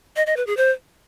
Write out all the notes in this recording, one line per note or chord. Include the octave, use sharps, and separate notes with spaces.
D#5
D#5
B4
G#4
C5